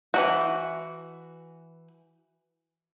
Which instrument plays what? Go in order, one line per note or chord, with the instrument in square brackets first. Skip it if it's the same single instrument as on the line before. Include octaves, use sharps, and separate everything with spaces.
[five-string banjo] E3 F#3 F#4